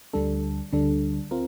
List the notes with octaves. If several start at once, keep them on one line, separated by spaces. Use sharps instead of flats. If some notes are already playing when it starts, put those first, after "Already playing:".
D2 D3 G3 D4 A4
D2 D3 G3 D4 A4
C4 F4 A#4